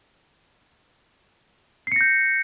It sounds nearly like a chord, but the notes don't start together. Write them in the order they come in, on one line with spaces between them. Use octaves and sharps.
C7 C#7 A#6 G6